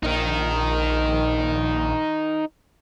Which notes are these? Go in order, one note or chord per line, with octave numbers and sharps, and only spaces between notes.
A#1 D#4 A#4